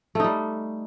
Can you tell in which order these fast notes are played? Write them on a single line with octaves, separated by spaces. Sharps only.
A3 D#4 G3